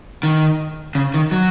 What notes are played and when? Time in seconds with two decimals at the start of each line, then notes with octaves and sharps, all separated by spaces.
0.23 D#3
0.95 C#3
1.14 D#3
1.32 F#3